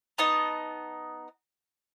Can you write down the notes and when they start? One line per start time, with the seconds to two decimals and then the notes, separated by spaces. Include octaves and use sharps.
0.18 B3 D#4 D#5 A5